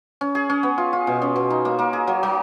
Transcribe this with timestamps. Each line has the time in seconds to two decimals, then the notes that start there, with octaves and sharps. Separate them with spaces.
0.21 C#4
0.35 G#4
0.50 C#4
0.63 B3
0.78 F4
0.93 F4
1.07 B2
1.22 C#4
1.36 B2
1.50 D#4
1.65 A#3
1.79 A#3
1.93 G#4
2.07 F#3
2.23 F#3